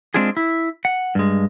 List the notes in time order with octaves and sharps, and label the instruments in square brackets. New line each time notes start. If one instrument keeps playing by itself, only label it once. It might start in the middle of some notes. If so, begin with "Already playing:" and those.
[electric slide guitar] G#3 C4 D4 F4 G#4
E4
F#5
G2 G#3